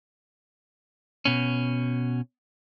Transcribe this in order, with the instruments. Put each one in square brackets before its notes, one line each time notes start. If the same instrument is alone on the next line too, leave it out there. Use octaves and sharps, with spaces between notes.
[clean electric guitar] B2 C#4